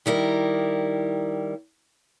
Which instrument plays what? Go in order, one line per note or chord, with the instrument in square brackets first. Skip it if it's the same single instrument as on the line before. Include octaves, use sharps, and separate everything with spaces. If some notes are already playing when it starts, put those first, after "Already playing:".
[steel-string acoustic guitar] D#3 G3 E4 A#4